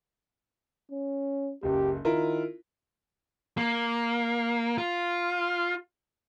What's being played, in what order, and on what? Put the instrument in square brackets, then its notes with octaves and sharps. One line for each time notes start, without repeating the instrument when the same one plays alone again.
[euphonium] C#4
[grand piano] F#1 C#2 [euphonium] G4
[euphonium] D#3 [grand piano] E4 F4 A#4
[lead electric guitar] A#3
F4